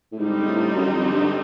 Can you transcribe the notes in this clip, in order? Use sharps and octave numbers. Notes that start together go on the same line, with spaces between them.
A2
G#2 D3 G3 C4 D#4
A2
F#2
F2
G2